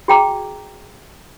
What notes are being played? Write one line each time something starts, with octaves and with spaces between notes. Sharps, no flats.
F#4 G#4 G5 A#5 D6